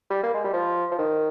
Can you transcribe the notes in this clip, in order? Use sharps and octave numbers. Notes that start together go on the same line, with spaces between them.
G3
A#3
G#3
G3
F3
F3
D#3